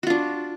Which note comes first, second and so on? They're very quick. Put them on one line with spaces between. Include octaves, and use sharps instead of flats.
F#4 F4 D4